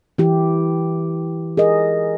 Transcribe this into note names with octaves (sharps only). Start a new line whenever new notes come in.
E3 E4 G4
G#4 A#4 D#5